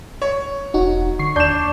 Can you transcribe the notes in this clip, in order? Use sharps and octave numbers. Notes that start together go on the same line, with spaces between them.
C#5
E1 D#4 F#4
D3 C#6 C7
D#2 D4 G6 E7